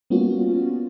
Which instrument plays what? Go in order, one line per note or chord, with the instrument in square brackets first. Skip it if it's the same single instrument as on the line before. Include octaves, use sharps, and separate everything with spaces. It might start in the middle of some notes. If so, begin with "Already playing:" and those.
[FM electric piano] G3 A#3 B3 C#4 F4 F#4